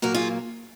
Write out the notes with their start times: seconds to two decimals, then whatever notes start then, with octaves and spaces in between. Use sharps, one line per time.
0.02 A#2 F#3 A#3 F#4 A#4
0.14 F4 G#4